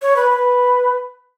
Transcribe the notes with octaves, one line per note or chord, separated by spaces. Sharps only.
C#5
B4
B4